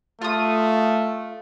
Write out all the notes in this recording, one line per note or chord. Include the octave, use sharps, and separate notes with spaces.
A3 F4 D#6